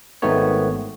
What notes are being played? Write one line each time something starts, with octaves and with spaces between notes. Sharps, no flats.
G#1 G#2 D#3 A3 B3 C#5